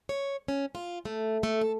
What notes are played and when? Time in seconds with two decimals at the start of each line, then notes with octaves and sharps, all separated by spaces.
0.09 C#5
0.48 C#4
0.75 F4
1.05 A3
1.43 A3
1.61 A4